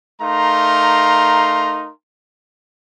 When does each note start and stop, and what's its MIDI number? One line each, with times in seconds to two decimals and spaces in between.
0.22 1.91 57
0.22 1.91 63
0.22 1.91 70
0.22 1.91 77
0.22 1.91 82
0.22 1.91 84